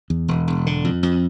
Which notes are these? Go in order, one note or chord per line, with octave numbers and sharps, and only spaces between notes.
E2
E1
E1
D3
F2
F2